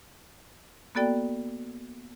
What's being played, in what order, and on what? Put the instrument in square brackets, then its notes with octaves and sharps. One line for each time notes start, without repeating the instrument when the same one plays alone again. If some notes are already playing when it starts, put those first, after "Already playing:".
[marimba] A#3 B3 F#4 A4 D5 G5